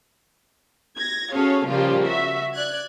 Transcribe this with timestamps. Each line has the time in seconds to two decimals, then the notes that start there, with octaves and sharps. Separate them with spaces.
0.98 G#6 A#6
1.34 C#4 F#4 G#4 A4 C#5 F5
1.68 C#3 F3 G3 A#3 F4 G4
2.06 F#4 E5
2.53 D5 F#6 G#6